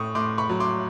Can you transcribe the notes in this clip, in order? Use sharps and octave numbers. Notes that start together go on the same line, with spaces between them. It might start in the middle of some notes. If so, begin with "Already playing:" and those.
Already playing: A2 A3 C#6 D#6
A2 C6 D6
B5 C#6
F#3
C6 D6